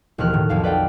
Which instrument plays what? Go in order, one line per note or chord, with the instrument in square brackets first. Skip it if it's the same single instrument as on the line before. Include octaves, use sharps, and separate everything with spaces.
[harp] E1 D#2 F3 F6 F#6
A2 D#3
B1 F2 F5 A5
B4 D5 F5 G5